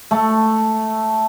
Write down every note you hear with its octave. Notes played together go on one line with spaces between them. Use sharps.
A3